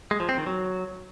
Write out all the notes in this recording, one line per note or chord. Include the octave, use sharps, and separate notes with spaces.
G#3
F3
C4
D#3
F#3